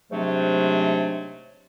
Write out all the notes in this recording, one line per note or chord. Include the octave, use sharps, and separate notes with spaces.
G#2 C3 F#3 A3 D4